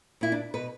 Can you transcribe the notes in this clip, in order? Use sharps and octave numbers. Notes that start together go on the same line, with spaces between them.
A#2 E4
D4
B2 B4